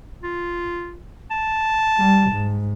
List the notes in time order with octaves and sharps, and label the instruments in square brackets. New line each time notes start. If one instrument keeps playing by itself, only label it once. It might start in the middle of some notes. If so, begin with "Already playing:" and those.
[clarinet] F4
A5
[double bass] G3
G#2